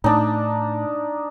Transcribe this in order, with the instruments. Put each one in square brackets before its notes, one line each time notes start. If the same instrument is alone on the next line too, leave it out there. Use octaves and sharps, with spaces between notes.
[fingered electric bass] A2 [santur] D4 D#4